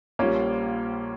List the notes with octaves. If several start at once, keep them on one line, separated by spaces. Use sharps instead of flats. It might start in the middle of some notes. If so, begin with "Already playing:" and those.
A#1 A#2 G3 A#3 C#4